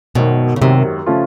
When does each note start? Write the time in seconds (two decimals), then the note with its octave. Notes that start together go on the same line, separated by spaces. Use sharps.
0.15 G#1 F#2 B2 D#3
0.56 C#3
0.61 G#1 F#2 C3 D#3
1.06 C#3 F3 A3 C#4 F4